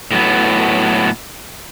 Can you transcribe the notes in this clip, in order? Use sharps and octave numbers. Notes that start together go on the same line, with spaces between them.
A2 F#3 B3